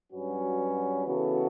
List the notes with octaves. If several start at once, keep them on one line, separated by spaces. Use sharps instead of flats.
G2 F#3 C#4 F#4 B4
C#3 E3 B3 F#4 A4